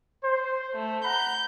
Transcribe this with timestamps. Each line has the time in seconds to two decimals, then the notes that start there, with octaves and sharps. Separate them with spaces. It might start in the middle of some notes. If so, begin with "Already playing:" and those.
0.24 C5
0.74 A3
1.04 F#5 A#5 B5 G6